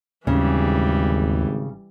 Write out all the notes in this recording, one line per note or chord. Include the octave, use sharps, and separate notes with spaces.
G#1 D#2 C#3 E3 G3